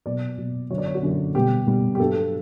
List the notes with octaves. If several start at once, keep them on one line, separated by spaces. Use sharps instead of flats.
B2 F#3 D5
B2 F#3
F#2 D3 F#3 C#5
D5
C#5
F#4
F#2 D3 F#3
B2 G3 G4
B2 G3
G4
G2 F#3 A4